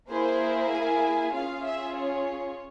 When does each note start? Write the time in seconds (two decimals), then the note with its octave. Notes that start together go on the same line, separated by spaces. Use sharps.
0.11 A#3 E4 G#4 C5
0.72 G#5
1.34 C#4 F4 G#4 F5
1.65 E5
1.96 C#5